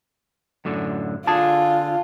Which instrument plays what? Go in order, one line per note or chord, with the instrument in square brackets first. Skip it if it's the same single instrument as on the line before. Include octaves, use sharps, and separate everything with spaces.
[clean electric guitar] F#2 A2 D3
[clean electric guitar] D3 G#4 [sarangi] F4 [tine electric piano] A5